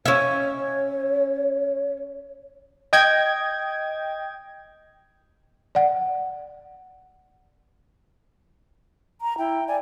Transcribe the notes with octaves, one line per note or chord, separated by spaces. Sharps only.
C#4 C#5 E5
D#5 G5 G#6
D5 F#5
A#5
E4 G5
D5 G#5